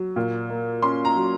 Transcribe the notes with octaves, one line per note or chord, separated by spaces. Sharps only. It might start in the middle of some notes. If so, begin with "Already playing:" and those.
Already playing: F#3
A#2
A#3
C#4 C6
A#5
F#3